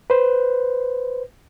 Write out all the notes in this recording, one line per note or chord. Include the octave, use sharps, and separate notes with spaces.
B4 C5